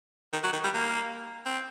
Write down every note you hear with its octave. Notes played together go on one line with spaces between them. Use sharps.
D#3
F#3
D#3
G3
A#3
C4